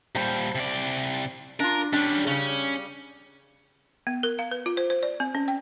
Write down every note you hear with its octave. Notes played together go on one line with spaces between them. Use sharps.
A#2 G3 C5 A5
C3 D5
D4 F4 A#4
G3 C#4 D4
C#3 G3 C#4
B3
A#4
F5
B4
F4
C5
C5
D5
C4
C#4
G5